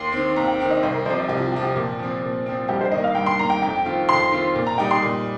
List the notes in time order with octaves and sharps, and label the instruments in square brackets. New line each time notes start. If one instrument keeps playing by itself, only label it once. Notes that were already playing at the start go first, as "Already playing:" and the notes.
Already playing: [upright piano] D#2 [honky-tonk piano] C6
[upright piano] D#3 C4
[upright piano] D#2 [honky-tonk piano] A#5
[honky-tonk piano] G5
[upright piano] D#3 C4
[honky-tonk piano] D#5
[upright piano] C2 [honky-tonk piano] C5
[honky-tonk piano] A#4
[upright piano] C3 F3 [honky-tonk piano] C5
[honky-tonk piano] D#5
[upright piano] C2 [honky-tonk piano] G4
[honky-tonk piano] F4
[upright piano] C3 F3 [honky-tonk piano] G5
[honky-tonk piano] G4
[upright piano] A#2
F3 C4
A#2
F3 C4
[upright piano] G2 [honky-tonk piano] G4
[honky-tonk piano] C5
[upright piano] D#3 A#3 [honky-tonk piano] D#5
[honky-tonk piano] F5
[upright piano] G2 [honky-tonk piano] G5
[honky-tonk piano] C6
[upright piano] D#3 A#3 [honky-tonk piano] A#5
[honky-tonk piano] G5
[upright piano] F2 [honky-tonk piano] G5
[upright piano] D#3 C4 F4
[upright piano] F2 [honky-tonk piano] C6
[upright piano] D#3 C4 F4
A#2
[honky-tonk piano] A#5
[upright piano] G3 D#4 [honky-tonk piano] G5
[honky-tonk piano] C6
[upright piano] A#2